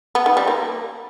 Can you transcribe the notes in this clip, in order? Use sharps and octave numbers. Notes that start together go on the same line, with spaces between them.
B3
D#3
G3
A#3